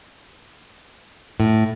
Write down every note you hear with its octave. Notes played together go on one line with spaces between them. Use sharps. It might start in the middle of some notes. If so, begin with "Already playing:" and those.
A2